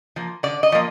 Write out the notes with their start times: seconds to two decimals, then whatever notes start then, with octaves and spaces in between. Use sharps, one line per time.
0.16 F3 A#3
0.43 D3 D5
0.63 D#5
0.72 F3 A#3